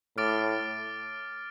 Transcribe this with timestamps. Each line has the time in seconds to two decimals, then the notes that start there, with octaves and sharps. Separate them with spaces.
0.17 A2 D6 F6 A6 D7